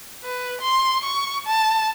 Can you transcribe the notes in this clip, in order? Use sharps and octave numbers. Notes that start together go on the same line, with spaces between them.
B4
C6
C#6
A5